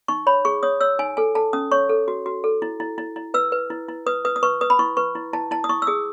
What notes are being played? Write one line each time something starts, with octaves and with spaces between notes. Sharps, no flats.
D#4 C#6
C#5 B5
G#4 C#6
C#5 D#6
C#5 E6
D#4 G#5
A4 G#5
A4 A5
C#4 D#6
C#5 C#6
A4
F#4
F#4
A4
E4
E4
E4
E4
B4 E6
B4
E4
E4
B4 D#6
B4 D#6
D#6
B4 C#6
B4 D#6
B5
E4 C#6
B4 C#6
E4
E4 A5
E4 A5
D#6
E4 C#6
E6
G#4 D#6